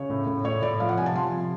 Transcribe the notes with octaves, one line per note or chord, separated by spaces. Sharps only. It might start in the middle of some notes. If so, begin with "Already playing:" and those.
Already playing: C#3 C#5
A2
A2
A2 C#5
A2 D5
F3 F5
F#5
C3 G#5
A5
F3 C6
C3